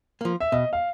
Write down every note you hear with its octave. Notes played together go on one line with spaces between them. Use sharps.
F3 A#3
E5
B2 D#5
F5